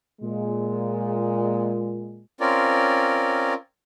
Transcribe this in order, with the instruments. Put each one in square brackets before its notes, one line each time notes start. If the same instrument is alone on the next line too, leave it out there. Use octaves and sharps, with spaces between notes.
[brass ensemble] A#2 G#3
[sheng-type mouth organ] C4 C#4 F4 A#4 D5